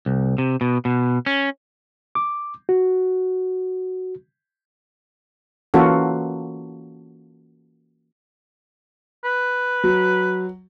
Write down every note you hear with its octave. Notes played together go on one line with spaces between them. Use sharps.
C2
C3
B2
B2
C#4
D6
F#4
E3 A#3 C#4 F4 F#4 A4
B4
F#3